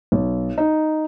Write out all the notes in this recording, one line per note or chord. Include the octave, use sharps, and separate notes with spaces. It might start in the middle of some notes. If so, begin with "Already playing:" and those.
B1
D#4